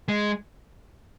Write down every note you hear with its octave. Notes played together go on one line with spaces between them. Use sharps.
G#3